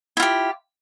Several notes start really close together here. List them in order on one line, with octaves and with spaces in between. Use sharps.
E4 F4 G4